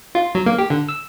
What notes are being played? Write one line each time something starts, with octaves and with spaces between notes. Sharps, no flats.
F4
F#3
A#3
G4
D3
E6